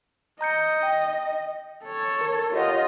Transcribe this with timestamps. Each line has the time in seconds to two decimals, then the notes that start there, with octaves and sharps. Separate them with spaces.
0.41 D#5 A#5 G6 C#7
0.83 G5
1.85 A4 C#5
2.21 A#4
2.53 F4 G4 C#5 D#5 F#5